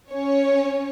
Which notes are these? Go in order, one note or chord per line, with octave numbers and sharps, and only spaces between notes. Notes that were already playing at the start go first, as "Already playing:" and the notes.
C#4 C#5